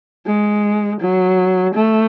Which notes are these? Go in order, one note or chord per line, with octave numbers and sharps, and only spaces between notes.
G#3
F#3
A3